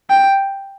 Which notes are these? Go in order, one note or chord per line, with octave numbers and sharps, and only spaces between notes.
G5